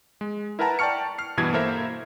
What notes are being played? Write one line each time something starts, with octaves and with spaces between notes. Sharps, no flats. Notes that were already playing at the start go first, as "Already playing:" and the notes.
G#3
E4 A#4 B4 F#5 A5 A#5
D5 G5 A5 C#6 F6 C#7
F6 C7
G2 B2 E3 G#6
A#3 E4 A4 A#4 C5 E5